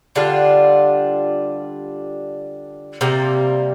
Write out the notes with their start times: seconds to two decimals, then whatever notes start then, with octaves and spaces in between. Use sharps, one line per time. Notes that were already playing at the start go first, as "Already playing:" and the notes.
0.16 D3 G3 D4 F4
3.01 C3 G3 A#3